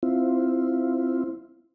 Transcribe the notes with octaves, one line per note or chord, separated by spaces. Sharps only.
C4 E4 F4